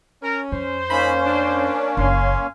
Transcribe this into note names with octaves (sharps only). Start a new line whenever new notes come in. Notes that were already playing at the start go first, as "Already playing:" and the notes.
C#4 A#4
F2 C5
A#3 C#4 D#4 B5
D4
F#1 F5 G#5 C6